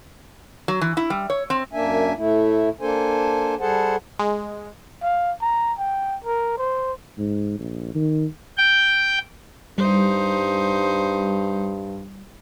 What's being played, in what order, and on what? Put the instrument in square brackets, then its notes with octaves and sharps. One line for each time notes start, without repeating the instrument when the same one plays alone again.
[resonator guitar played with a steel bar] F#3
E3
E4
G3
C#5
C4
[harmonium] F#2 A#3 D4 E5 G#5
A2 A3 E4
A#3 D4 A4 C5 G#5
G3 G#4 A4 C5 F#5 A5
[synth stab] G#3
[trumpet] F5
A#5
G5
A#4
C5
[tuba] G#2
A#1
D#3
[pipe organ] G5
[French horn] G2 [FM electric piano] G3 [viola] D#4 C5